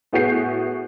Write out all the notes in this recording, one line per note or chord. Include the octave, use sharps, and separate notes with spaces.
A2 B3 F#4 G#4 G6 C7